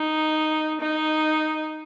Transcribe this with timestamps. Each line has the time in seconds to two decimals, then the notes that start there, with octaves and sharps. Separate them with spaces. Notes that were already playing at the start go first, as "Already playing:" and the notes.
Already playing: D#4
0.81 D#4